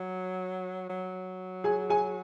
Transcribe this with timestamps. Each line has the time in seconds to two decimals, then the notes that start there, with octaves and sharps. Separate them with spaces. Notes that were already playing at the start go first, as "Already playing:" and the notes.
Already playing: F#3
0.89 F#3
1.64 G#4 G#5
1.90 G#4 G#5